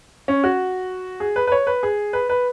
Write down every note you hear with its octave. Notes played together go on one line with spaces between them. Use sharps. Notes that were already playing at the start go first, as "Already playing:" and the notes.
C#4
F#4
G#4
B4
B4
C#5
B4
G#4
B4
B4